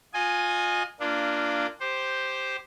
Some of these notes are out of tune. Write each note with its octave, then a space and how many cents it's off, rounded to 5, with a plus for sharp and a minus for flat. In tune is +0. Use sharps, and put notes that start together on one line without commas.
F4 +25 D#5 -15 G#5 +0
A#3 -15 D4 +0 F4 -20
G4 +0 C5 +0